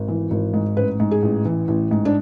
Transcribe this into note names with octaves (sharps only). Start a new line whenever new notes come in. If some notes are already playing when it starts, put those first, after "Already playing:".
Already playing: G#1
E3
G#1
G#2
A1 B4
G#2
G#4
A1
E3
A1
G#2
D4